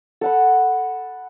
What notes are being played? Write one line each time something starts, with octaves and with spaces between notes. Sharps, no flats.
A4 F#5 B5